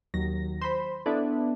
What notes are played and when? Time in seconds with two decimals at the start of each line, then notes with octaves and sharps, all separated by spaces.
0.14 D#2 F#3 A#6
0.61 C5 B5
1.06 B3 D4 E4 A4